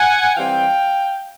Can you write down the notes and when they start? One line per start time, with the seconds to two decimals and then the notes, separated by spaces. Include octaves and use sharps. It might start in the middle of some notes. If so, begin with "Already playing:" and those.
Already playing: F#5 G#5
0.35 E3 G3 C4 F5 G5